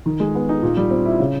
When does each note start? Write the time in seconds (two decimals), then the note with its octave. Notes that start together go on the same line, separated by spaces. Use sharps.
0.06 D#3
0.20 G#3
0.35 B3
0.49 D#4
0.62 A#2
0.77 G3
0.91 C4
1.05 E4
1.19 C#3